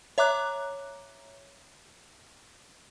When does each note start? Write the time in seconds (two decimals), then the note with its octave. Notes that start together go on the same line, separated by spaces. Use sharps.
0.18 C#5 E5 A#5 D6 F#6